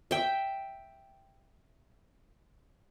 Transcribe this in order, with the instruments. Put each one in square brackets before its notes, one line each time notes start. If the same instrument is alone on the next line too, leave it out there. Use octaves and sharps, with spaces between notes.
[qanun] E5 G5